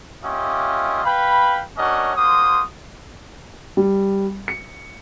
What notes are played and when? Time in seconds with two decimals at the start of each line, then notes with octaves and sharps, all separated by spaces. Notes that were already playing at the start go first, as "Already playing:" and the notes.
0.24 A#3 C#4 F4 G4 D#5 E5
1.05 B4 F5 G5 B5
1.77 C#4 D4 F#4 A#4 C#5 D#5
2.16 A#3 F#4 C5 C6 D#6
3.77 G3
4.48 C#7